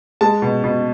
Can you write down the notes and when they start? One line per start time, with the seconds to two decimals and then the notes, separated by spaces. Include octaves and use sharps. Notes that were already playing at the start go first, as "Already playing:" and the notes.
0.21 G#3 A5
0.42 B2
0.64 B2